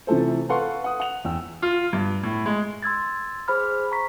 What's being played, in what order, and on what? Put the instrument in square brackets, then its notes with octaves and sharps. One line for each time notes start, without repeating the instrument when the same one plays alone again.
[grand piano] C3 E3 F3 A3 A4 C5
A4 B4 F5 F#5 C6 C#6
F#5 D#6
F#5 F7
E2 G5 E6
F4
G2
A2
G#3
[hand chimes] C6 E6 G#6 A6
G#4 C5 B5 F6
A#5 C#6 B6